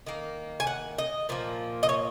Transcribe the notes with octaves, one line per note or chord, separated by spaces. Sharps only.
D#3 A#3
G#5
F#5
D#5
A#2 F3 A#3
D#5
C#5